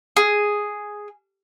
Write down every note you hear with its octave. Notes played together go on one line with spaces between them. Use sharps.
G#4